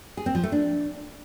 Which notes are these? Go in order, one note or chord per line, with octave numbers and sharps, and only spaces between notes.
G#4
C4
F3
A3
D4